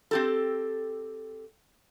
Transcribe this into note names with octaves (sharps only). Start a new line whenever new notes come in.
C4 G4 A4